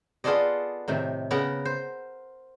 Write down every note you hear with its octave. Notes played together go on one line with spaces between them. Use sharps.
B3 F4 G#4 A4 D5 D#5
A2 C3 D#3
C#3 B3 A#4 F#5 A#5
C5